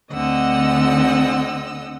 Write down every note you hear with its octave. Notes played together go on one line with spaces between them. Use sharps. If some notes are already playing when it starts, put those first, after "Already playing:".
D2 D3 C4 D#5 F#5 E6